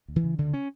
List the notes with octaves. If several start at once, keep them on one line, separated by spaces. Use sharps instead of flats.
D2
E3
C#3
D2 D3
C#4